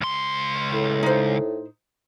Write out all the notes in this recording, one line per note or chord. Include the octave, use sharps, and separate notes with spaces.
C#2 C6
A2
D#4 C5